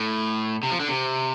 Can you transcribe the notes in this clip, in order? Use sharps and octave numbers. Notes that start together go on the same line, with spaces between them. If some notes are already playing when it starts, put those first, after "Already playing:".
Already playing: A2
C3
F3
D3
C3